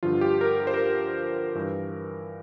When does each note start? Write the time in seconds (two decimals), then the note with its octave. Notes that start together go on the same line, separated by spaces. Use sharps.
0.03 G2 D3 F3 F4
0.21 G4
0.41 A#4
0.60 A#4
0.67 C5
0.74 A#4
1.55 G2 E3